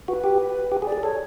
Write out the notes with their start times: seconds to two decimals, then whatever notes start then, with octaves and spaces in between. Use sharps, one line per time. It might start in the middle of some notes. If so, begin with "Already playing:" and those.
0.08 F#4 B4
0.24 G4
0.72 G4
0.82 G#4
0.87 D5
0.92 G#4
1.03 A4 C#5